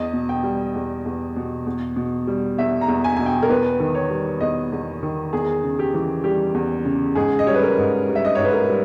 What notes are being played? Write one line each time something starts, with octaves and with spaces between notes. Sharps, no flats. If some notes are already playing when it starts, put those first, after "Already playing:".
Already playing: E2 D#5
B2
G5
G3
E2
E2
B2
E2
B2
G3
E2 E5
A#5
E2
G#5
B2 G#5
G5
A#4
E2 B4
D#3
C#5
G3
E2 D#5
E2
D#3
E2 G#4
C#3
G4
E3
G3 G4
E2
C#3
G#2 G#4
D#5
G3 C#5
B4
A#4
G#2
G3
E5
D#5
G#2 C#5
B4
A#4
G3